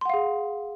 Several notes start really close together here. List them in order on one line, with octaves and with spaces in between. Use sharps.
C6 F#5 F5 G#4